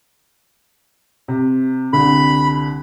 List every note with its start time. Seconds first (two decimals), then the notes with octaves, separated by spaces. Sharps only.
1.28 C3
1.93 C2 D3 B5